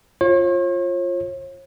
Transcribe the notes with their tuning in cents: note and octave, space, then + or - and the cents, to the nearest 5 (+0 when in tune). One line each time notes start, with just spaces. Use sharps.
F4 +0 C#5 -45